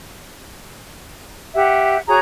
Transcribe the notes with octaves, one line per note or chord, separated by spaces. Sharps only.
G4 E5 F#5
F#4 G#4 C#5 A#5